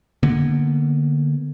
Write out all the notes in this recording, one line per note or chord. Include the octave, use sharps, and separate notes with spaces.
D3 A#3 B3